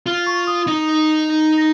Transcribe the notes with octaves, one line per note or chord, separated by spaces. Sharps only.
F4 F6
C#6
D#6
D#4
A#6